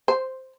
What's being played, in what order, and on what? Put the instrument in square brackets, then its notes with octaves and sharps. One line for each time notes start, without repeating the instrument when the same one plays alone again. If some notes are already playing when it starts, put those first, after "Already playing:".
[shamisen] C5